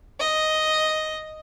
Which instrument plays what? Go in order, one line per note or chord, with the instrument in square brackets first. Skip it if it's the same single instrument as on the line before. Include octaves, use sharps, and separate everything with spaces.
[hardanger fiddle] D#5